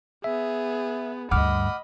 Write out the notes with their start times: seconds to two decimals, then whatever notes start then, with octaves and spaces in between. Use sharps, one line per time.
0.24 B3 G#4 E5
1.31 D2 G2 D#5 F#5 B5 D6 F6